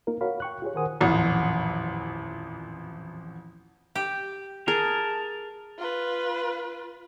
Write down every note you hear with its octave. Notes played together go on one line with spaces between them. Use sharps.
A#3 D#4 F4 A#4
F#4 A#4 C#5 F5 B5
G5 C#6 F#6
F4 G4 G#4 C#5
D#3 A#4 C5 F#5 G#5 D#6
D#1 A1 F2
G4
G#4 A#4 A5
F4 B4